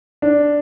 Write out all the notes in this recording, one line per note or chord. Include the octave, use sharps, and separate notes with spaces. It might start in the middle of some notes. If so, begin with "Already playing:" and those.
D4